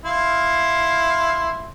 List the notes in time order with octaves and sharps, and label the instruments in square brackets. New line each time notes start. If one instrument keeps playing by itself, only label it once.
[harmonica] E4 F5 C6